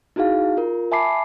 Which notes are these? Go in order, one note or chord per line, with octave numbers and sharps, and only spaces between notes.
D#4 E4 F#4 G#4 F5
F4 A#4
E5 G#5 A5 B5 D6 C7